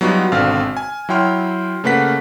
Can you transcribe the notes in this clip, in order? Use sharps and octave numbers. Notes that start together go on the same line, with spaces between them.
F#3 G3 B3 D#4 F4 F#4
G#1 B2 D3 C4 F5 F6
G#5
F#3 E4 C#5 G5 C6 F6
C#3 A3 A#3 B4 F#5 B6